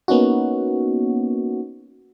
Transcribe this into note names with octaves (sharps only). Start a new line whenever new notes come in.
A#3 B3 C#4 D#4 F#4